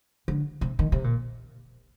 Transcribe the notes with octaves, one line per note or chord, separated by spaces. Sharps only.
D3
C3
D#3
C3
A#2